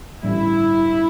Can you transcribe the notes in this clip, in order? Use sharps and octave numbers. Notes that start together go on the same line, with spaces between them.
A1 G2 D3 E4